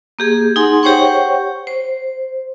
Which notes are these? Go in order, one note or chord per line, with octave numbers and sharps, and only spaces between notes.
A#3 G4 G#4
D#4 G#4 F#5 G#5 C6
G4 C5 C#5 F#5 G5 C#6
C5